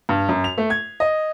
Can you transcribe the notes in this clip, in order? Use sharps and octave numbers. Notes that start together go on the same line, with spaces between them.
G2
F#2
F7
A3
G#6
D#5